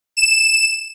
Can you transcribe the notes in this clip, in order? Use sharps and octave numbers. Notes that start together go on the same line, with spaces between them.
E7